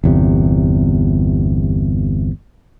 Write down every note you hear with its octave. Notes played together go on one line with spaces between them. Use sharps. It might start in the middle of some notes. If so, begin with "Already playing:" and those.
G1 E2 C3